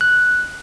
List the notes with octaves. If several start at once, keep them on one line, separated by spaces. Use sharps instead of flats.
F#6